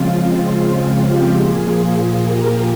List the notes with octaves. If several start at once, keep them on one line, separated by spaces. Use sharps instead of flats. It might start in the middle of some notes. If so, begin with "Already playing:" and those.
Already playing: C#3 F3 G#3 C4 F4
F4
G4
A#2 F3 A#3 F4 G#4
G4 A#4